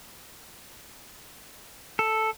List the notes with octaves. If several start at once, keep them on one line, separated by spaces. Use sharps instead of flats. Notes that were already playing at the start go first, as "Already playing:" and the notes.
A4